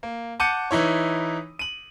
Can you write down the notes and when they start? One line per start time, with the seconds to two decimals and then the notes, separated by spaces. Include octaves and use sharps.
0.03 A#3
0.40 F#5 A5 D6 G6 C#7 D#7
0.71 E3 D#4 E4 C#5
1.59 D#7 F#7